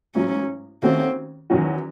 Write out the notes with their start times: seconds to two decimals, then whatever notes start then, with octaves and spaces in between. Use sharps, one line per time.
0.15 A1 G#2 F#3 C#4
0.82 D#2 D#3 A3 C4 C#4 F#4
1.50 E2 D#3 F#3 C#4 F#4